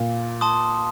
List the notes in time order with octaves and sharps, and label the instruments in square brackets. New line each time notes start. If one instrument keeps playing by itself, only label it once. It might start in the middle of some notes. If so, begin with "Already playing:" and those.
Already playing: [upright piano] A#2
[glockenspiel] A5 C6 D#6